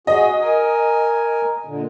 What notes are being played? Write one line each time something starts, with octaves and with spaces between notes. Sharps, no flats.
F#4 G#4 D#5
A#4 G#5
A#2 D3